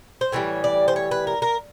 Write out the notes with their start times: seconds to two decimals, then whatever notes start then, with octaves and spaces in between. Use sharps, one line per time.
0.21 C5
0.32 A2 E3 G3 C#5
0.64 D5
0.88 C5
0.96 C#5
1.11 B4
1.27 A#4
1.42 A#4